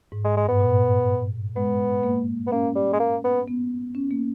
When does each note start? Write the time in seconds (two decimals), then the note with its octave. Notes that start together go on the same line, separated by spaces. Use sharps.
0.12 G#2
0.24 G#3
0.37 G#3
0.45 G2
0.48 G#2 B3
0.60 A#2
1.56 G#3 B3
2.03 A#3
2.47 B3
2.52 A#3 C#4
2.75 G3
2.93 G#3
3.00 A#3
3.24 B3
3.48 B3
3.95 C#4
4.11 A#3